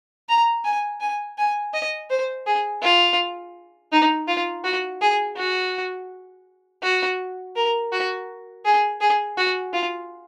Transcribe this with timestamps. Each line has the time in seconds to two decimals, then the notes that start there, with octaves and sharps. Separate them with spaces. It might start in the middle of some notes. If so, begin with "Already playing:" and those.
0.29 A#5
0.64 G#5
1.00 G#5
1.38 G#5
1.74 D#5
2.10 C5
2.46 G#4
2.82 F4
3.92 D#4
4.28 F4
4.64 F#4
5.01 G#4
5.37 F#4
6.83 F#4
7.56 A#4
7.92 F#4
8.65 G#4
9.01 G#4
9.37 F#4
9.73 F4